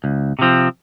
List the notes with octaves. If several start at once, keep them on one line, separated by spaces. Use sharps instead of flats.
C#2
C3 F3 C4